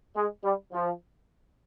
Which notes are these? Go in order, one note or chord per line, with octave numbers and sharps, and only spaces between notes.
G#3
G3
F3